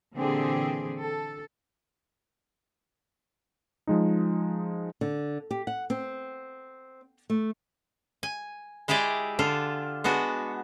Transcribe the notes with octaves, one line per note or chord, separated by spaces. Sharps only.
A#2 D3 E3 C4 G4 G#4
A4
F3 G#3 D#4
D3
G4
F#5
C4
A3
G#5
G#3 E4 G4 G#4 D5
D3 D4 F4
G#3 B3 D4 F#4